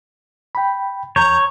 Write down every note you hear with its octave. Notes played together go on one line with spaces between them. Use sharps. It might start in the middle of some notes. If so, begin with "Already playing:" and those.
G5 B5
F2 C#5 A#5 G6